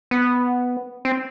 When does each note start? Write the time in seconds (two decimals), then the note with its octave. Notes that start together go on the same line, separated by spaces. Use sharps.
0.11 B3
1.05 C4